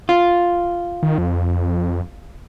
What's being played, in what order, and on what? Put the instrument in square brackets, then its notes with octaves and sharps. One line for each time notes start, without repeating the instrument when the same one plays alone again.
[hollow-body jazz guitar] F4
[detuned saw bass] D#3
F2